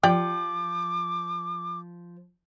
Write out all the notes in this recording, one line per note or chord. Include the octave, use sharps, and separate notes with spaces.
F3 G4 D5 G5 D6